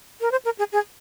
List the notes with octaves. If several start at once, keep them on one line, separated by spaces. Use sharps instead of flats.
A#4
C5
A#4
G#4
G#4